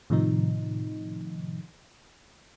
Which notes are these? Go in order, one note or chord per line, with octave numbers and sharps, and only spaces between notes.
A2 C3 D#3 F3 D#4